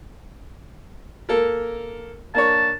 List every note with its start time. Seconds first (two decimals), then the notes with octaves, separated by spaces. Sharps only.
1.29 A#3 A4 A#4
2.34 A#3 D4 C#5 A5